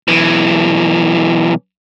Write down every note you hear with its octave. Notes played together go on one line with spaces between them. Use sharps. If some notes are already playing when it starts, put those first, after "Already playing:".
B1 E3